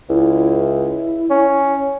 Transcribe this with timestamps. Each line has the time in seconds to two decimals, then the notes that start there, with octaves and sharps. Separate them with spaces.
0.09 C#2 E4
1.30 C#4